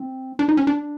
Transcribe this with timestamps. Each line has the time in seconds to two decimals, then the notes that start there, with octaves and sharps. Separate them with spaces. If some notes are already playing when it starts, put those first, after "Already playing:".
Already playing: C4
0.39 D4
0.49 D#4
0.57 C#4
0.67 D4